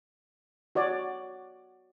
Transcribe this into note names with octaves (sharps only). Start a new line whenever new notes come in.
F#4 C#5 D5